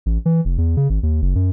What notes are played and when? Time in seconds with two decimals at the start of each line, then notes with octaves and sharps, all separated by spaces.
0.06 A1
0.26 E3
0.45 F1
0.58 E2
0.77 C#3
0.90 G#1
1.03 D#2
1.22 F#1
1.35 F#2